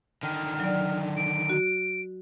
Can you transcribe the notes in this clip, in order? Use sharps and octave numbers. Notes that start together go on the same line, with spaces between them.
D3 D#3 F6
F#3 D5
D7
F#4